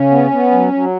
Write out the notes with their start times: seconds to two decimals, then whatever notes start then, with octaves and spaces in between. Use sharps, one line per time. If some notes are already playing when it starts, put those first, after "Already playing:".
Already playing: C#3 C#4
0.10 B3
0.30 B3
0.51 F#3
0.73 F#3